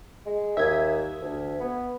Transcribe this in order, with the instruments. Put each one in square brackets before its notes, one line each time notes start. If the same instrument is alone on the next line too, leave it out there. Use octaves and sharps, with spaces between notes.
[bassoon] G#3
[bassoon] D#2 [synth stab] E5 D#6 G#6
[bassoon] D2
B3